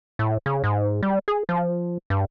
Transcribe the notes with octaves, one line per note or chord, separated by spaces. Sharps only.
A2
C#3
G#2
G3
G#4
F3
G2